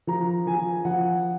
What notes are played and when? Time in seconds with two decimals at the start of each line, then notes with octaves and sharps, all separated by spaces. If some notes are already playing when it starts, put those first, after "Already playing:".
0.07 F3 A#5
0.47 F3 G#5
0.85 F3 F#5